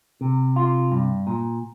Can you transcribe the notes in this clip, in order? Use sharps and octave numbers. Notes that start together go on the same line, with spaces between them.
C3
F4
G2
A#2